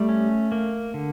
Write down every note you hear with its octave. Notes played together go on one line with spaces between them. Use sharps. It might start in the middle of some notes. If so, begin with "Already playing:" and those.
Already playing: G3 A3
C#4
A#3
D3